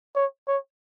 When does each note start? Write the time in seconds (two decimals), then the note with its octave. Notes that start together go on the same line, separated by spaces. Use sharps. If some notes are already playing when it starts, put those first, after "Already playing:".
0.15 C#5
0.48 C#5